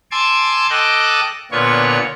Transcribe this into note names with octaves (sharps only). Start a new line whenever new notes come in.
G#5 A5 C6 D6 E6 G#6
A4 D#5 G5 A5 D6 F#6
A#2 D3 B3 F4 C#5 C#6